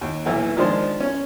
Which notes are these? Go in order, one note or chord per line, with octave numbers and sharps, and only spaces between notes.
D#2
B1 A#2 E3
D#3 F3 G#3 D4 C5
C#4